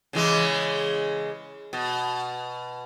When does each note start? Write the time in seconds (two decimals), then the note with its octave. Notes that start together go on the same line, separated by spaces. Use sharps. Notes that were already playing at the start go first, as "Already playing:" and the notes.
0.13 C#3 E3 G#3
1.73 B2